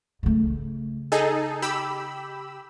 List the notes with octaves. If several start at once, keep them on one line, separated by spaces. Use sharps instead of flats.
C#3 A3
D#4 G#4 A4
G4 B5 E6